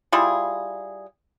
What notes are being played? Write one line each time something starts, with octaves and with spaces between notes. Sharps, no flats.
G3 E4 F4 G#4